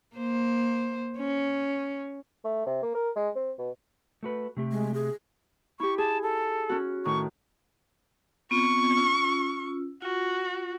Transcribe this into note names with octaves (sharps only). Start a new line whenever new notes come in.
A#3 C5
C#4
A3
C3
A#3
A#4
G#3
C4
B2
A3 F#4 B4
C3 A3 G4
G#3
G#4
E4 G4 C#6
G#4 A5
A4
C#4 F#4
A2 D#3 C#6
B3 C4 F4 C#6
C#4 F4 E6
F4 F#4